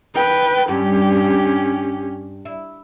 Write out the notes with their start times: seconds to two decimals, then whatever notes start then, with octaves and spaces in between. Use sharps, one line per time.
0.15 D#2 B4 G5
0.69 G2 C#4 G4
2.45 E4